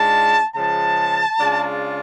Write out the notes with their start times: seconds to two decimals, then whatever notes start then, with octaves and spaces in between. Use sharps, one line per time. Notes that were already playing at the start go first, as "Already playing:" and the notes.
Already playing: G#2 G#3 D4 F4 A5
0.56 C#3 F3 G#3 A5
1.39 C#3 G#3 D4 F4